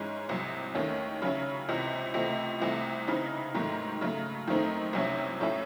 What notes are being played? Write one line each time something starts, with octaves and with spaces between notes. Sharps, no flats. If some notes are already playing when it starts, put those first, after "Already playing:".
Already playing: G#2 E3 G#3 C#4
C2 C3 F#3
D#2 D#3 A3 C#4
C#3 F#3 C#4 E4
C#2 C3 E3
C#2 C3 E3 A3 C4
C2 C3 E3 A3
C#3 E3 C4 D#4
G#2 D#3 F#3 A3
C#3 F#3 A3
F#2 D#3 A3 C4 D#4
C2 C3 F#3 C#4 E4
A2 F#3 C#4 E4